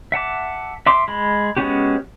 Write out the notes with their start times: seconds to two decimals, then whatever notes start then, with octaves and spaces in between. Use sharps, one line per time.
0.12 E5 F#5 A5 D6
0.87 E5 C6 D6
1.08 G#3 B5
1.57 G#3 B3 C#4 F#4 G4